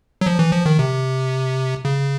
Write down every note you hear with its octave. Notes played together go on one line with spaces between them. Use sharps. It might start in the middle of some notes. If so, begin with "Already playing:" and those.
F#3
F3
E3
F3
D#3
C3
C#3